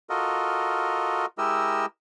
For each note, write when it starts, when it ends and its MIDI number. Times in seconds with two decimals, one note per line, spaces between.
0.10 1.26 65
0.10 1.26 66
0.10 1.26 69
0.10 1.26 70
0.10 1.26 75
1.38 1.86 56
1.38 1.86 64
1.38 1.86 67
1.38 1.86 70
1.38 1.86 75
1.38 1.86 88